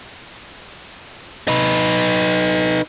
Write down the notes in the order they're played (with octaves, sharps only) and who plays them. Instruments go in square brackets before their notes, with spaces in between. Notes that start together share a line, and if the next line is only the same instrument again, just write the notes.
[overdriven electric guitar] D#4 B4